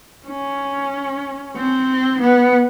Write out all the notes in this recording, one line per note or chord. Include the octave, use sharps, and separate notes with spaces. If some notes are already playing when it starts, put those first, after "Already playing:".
C#4
C4
B3